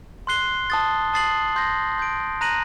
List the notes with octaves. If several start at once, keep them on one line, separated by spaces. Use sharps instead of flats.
C6 F#6 C7 G7
A5 D#6 A6
A5 D#6 A6 C7 F#7
C6 G6 A#6
C6 G6 D7
A#5 F#6 A#6 D#7 F#7